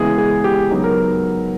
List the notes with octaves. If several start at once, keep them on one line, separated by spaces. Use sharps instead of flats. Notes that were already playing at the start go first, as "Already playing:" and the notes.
Already playing: C#3 E3 G#3 B3 G#4
G#4
G4
C#3 F#3 B3 D#4
A#4